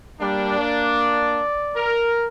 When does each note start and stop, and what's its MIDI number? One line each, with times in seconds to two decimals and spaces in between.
0.21 0.58 55
0.21 1.42 58
0.21 1.42 62
0.59 1.99 74
1.76 2.27 70